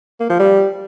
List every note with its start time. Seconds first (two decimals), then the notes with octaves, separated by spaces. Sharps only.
0.20 A#3
0.30 F3
0.40 G3